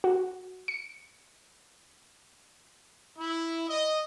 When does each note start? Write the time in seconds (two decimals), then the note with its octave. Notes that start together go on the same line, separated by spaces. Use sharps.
0.04 F#4
0.68 C#7
3.19 E4
3.69 D#5